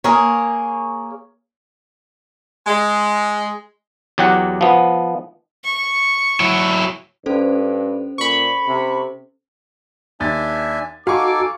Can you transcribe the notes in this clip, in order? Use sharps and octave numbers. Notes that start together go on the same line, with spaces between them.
A#3 G#4 A#4 C#5
G#3
E2 F#3 G4 F#5
F3 B3
C#6
F#3 E4
G2 C#4 A4 C5
A#2 B5 C#6
C3
D#2 D4 E5 G#5 A6
D#4 F#4 A4 F5 G#5 C#6 D6